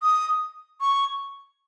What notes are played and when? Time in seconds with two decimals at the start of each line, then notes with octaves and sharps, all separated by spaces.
0.02 D#6
0.81 C#6